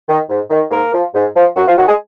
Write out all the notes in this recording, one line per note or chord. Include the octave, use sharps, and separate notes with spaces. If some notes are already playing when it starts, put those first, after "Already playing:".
D#3
G#2
D#3
G#2 A#3 A#4
F3
G#2
F3
F#2 F#3 F#4
F3 F4
D#3 F#3 F#4
G#3 G#4